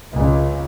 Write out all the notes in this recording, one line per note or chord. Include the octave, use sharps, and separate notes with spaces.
C#2